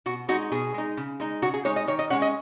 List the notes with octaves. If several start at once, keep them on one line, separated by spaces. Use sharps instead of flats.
B2 F#4
G#3 D#4 F#4
B2 G#4
G#3 D#4
C#3
G#3 D#4
C#3 F#4
G#4
G#3 D#4 C#5
D#5
D#3 C#5
D#5
G#3 C#4 F#5
D#5